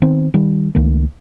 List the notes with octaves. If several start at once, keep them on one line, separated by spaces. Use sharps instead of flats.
D#3 B3 C4
D#3 G3
C#2 D#3 A3 A#3